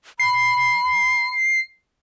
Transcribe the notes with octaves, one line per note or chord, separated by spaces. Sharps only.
B5 C7